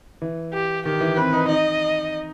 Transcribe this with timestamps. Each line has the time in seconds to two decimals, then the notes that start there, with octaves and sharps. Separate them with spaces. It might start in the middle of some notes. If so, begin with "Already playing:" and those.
0.22 E3
0.53 G4
0.85 D#3 G4
1.01 E3
1.17 C4 B4
1.33 D#4
1.48 D#4 D#5